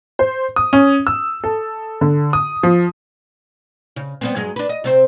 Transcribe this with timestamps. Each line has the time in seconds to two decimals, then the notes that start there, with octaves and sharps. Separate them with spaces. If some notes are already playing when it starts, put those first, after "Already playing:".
0.19 C5
0.56 D#6
0.73 C#4
1.07 E6
1.44 A4
2.01 D3
2.33 D#6
2.63 F3
3.96 C#3
4.21 G3 B3 C4
4.36 G2 F#3 G#3
4.56 D4 B4
4.69 D#5
4.84 C3 C4 C5